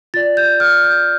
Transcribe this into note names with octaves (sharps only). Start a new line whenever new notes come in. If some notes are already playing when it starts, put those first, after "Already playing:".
F4 D5 A6
G6
F6
G6